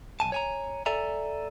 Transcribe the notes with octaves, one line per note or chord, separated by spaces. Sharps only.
B1 G2 G#5 A5
C#5 G#5 A#5
A4 D5 E5 G#5 A#5